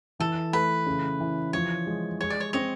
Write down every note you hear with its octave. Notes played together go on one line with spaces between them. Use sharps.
E3 A4
A3 B4
C#3
E3
F3 C#5
G#3
G#3 C#5
D5
C#5
C4 C#5 D#5